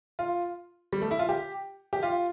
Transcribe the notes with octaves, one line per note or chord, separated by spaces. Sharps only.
F4
G3
A3
E4
F4
G4
G4
F4